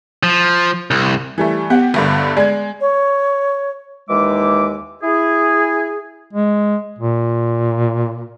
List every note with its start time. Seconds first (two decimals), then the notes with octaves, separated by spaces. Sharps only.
0.23 F3
0.91 C2
1.38 E3 G3 A3
1.70 B3 G4 F#5
1.94 G1 G2 D3
2.37 G#3 D5 G#6
2.81 C#5
4.10 D#2 E3 G#3 D#4 E5 D6
5.03 E4 G#4
6.33 G#3
6.99 A#2